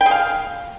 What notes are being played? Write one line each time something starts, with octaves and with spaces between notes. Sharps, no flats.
G5
G#4
F5